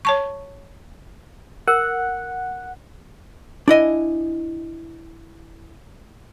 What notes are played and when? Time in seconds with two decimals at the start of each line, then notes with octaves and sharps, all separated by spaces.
0.05 C#5 A5 C#6
1.68 A#4 F#5
3.68 D4 E4 D#5 G#5